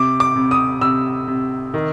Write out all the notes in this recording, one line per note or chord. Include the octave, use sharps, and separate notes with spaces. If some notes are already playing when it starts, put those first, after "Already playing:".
Already playing: C3 D6
D6
C3
D#6
C3 E6
C3
D#3